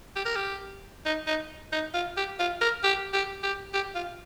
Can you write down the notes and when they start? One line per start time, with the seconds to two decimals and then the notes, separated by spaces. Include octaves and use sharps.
0.16 G4
0.25 A#4
0.35 G4
1.05 D#4
1.27 D#4
1.72 D#4
1.94 F4
2.17 G4
2.39 F4
2.61 A#4
2.84 G4
3.13 G4
3.43 G4
3.74 G4
3.95 F4